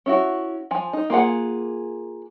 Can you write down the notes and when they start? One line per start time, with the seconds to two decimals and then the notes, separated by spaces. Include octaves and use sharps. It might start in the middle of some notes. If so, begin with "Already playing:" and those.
0.06 C#4 E4 F#4
0.71 F3 G#5
0.93 D#4
1.10 A#3 F4 G#4 F#5